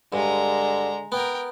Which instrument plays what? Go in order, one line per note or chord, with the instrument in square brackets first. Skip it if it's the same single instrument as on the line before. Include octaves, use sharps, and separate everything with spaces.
[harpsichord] G2 [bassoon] D3 [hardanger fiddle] G#3 A#5
[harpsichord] B3 [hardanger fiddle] A#4 G5